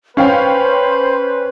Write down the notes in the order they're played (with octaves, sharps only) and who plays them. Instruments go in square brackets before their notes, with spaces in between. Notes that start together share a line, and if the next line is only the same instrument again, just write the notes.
[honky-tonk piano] C#4 F5 G5 [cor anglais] B4 [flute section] C5